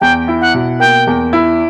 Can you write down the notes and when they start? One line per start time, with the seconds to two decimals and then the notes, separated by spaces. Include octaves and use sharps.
0.01 E2 G5
0.28 E4
0.41 F#5
0.54 B2
0.80 A#3 G5
1.07 E2
1.33 E4